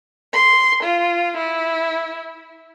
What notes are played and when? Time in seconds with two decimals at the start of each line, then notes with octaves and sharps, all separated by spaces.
0.33 C6
0.83 F4
1.37 E4